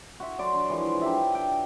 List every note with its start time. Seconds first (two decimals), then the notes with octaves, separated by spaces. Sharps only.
0.20 F#4 E5
0.39 F#3 D5 C6
0.54 D4
0.70 E3 F3 G#3
1.02 D4 D#4 G4 E5
1.35 G5